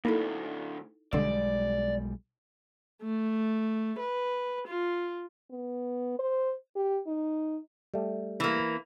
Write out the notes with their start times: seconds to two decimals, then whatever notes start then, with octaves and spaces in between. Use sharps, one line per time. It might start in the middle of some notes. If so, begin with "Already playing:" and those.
0.05 D2 A2 A#3 D#4 E4 A4
1.13 B1 D3 G3 G#3 D5 C6 E6
3.02 A3
4.00 B4
4.67 F4
5.51 B3
6.19 C5
6.76 G4
7.07 D#4
7.94 G3 A3
8.40 E3 A#3